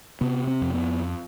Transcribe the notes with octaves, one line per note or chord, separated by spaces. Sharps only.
C3 B3
C4
F2
B3